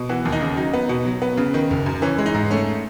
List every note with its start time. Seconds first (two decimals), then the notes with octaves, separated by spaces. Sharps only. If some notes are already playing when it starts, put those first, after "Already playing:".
Already playing: B2
0.09 E3 F#4
0.25 D#2
0.32 D#4
0.41 C#3
0.57 F#3 D#4
0.73 B3
0.89 B2
1.05 F#3
1.22 B3
1.37 C#3
1.54 D#3
1.71 F#1
1.86 F#2
2.02 E3 C#4
2.18 G#3
2.26 D#4
2.34 G#2
2.50 A3 C#4